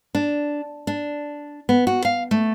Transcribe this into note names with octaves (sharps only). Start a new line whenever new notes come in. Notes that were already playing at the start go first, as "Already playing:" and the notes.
D4
D4
B3
F#4
F5
A3